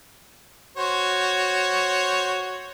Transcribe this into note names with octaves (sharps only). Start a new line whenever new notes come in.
F#4 C5 C#5